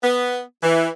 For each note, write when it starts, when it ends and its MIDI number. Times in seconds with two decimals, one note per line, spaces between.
0.04 0.40 59
0.63 0.89 52